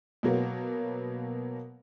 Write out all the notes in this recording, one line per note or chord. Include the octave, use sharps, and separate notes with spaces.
B2 F#3 A#3 B3